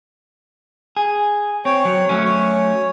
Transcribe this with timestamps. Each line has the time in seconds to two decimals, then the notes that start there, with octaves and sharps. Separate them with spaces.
0.97 G#4
1.65 C4 C#5
1.85 F#3
2.09 F#3 A3 C#4
2.24 C#5